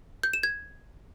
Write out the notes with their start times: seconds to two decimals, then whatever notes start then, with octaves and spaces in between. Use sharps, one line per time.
0.23 G6
0.33 E7
0.43 G#6